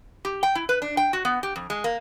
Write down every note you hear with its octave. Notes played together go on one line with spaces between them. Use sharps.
G4
G5
E4
B4
D4
G5
F#4
B3
G4
F2
G#3
A#3